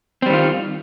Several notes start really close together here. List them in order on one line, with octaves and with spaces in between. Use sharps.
C4 G3 D#3 F4